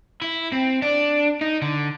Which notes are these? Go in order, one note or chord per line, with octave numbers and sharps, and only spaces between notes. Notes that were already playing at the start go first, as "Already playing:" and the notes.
E4
C4
D4
D#4
D3